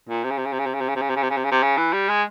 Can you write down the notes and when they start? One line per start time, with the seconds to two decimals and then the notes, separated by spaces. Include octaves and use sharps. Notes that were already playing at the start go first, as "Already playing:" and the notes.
0.09 A#2
0.24 C3
0.31 C#3
0.38 C3
0.46 C#3
0.53 C3
0.59 C#3
0.66 C3
0.74 C#3
0.81 C3
0.88 C#3
0.96 C3
1.02 C#3
1.09 C3
1.16 C#3
1.23 C3
1.30 C#3
1.37 C3
1.45 C#3
1.51 C3
1.63 C#3
1.77 E3
1.93 G3
2.09 G#3